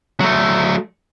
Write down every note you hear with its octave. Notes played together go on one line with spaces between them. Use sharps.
F#3 A3